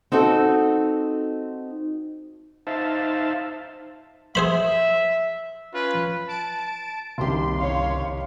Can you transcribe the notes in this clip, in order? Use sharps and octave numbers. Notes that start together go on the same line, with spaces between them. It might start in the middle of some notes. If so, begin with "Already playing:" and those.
C4 D#4 F#4 A4
D#4 C5 E5 F5 A5
G#4 C5 E5 B5
C#4 F4 B4
A5 D7
F#1 C2 D#3 G4 C6
C#5 F5